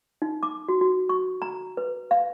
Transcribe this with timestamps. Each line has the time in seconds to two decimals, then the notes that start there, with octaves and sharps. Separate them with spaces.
0.22 D#4
0.43 D6
0.69 F#4
0.81 F#4
1.09 C#6
1.42 A#5
1.77 B4
2.11 F5